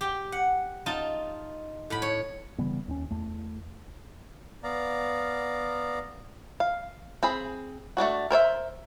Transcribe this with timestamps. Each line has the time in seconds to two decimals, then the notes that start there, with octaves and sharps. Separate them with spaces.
0.01 G4 G5
0.32 F#5
0.86 D#4 F4 A5
1.90 A2 B5
2.02 C#5
2.58 C#3 E3 G3 B3
2.88 D#2 C4 C#4
3.11 E2 A3
4.63 B3 D5 F5 A#5
6.60 F5
7.23 C4 G#4 B5
7.97 A3 A#3 D4 F#4
8.30 A#4 C5 C#5 E5